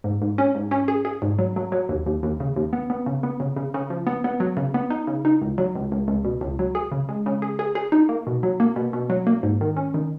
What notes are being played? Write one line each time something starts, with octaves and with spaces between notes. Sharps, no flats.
G#2
G#2
C#4
G#2
C#4
G#4
G#4
G#2
F#3
F#3
F#3
D#2
D#2
D#2
C#3
D#2
B3
B3
C#3
B3
C#3
C#3
C#3
F3
B3
B3
F#3
C#3
B3
D#4
C#3
D#4
C#2
F#3
C#2
C#2
C#2
B2
C#2
F#3
G#4
C#3
G#3
C#3
G#4
G#4
G#4
D#4
A#3
B2
F#3
A#3
B2
B2
F#3
A#3
G#2
D#3
C#4
D#3